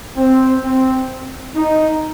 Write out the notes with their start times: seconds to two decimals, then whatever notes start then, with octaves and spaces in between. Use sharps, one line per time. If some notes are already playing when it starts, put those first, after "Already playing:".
0.17 C4
0.64 C4
1.56 D#4